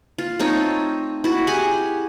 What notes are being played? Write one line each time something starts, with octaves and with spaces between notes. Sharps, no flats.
F4
A3 C4 D#4 C#5
E4 F#4
G4 G#4 F#5 G#5